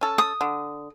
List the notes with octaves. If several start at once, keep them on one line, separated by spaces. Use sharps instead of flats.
C#4 A4
D#6
D3